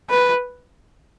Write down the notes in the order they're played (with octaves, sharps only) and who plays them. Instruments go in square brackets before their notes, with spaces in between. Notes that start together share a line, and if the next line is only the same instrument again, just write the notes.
[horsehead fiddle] B4